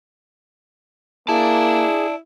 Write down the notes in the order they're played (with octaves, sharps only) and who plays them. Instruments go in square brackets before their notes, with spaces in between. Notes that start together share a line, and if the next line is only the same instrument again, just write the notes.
[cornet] A#3 [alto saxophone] E4 [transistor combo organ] G#4 [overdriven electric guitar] D5 A5